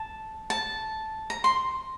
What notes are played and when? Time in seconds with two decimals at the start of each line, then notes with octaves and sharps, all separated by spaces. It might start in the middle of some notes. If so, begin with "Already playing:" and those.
Already playing: A5
0.50 A5
1.30 A#5
1.44 C6